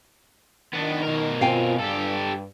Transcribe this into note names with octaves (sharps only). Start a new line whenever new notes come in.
D#3 B3 D4
B2 A#4
C4 F4 F5 G5 G#5
G2 G4 A4